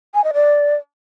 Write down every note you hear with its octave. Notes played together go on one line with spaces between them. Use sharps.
G#5
D#5
D5